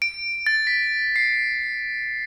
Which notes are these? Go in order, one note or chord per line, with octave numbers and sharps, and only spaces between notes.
D7
A6
B6
C7